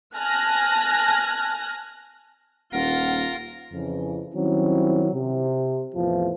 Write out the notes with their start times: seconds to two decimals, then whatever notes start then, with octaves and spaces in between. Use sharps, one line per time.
0.16 G#5 A5 F6 F#6 A#6
2.73 D#1 F4 A#4 F#5
3.71 F2 C#3 E3
4.34 D#3 F#3 G3 C4 C#4 E4
5.14 C3
5.95 E2 A2 C3 E3 F3